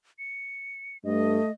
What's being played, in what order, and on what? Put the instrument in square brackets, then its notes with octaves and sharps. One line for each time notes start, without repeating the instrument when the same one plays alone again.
[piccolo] C#7
[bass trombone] G2 [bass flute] A3 [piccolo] D#5